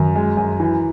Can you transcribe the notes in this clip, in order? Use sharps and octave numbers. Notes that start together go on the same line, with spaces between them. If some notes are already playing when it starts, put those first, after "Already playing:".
Already playing: F#2 D#3
G#3
F#2
E3